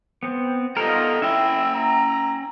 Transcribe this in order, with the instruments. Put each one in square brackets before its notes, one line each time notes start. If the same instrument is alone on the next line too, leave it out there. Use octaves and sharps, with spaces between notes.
[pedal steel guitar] B3 C4
[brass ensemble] G3 D#4 F4 [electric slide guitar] B3 A4 A#5 [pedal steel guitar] A#4 D#5
[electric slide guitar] C#4 G5 [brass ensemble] E4 [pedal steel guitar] E5
[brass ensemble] A#5